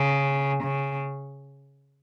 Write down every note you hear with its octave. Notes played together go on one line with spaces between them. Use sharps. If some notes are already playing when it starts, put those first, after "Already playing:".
Already playing: C#3
C#3